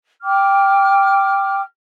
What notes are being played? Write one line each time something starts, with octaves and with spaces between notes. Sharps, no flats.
G5 D6 F6